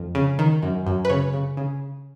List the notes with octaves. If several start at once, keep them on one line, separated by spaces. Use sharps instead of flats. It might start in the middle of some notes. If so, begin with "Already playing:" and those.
Already playing: F2
C#3
D#3
F#2
F#2
B4
C#3 C#5
C#3
C#3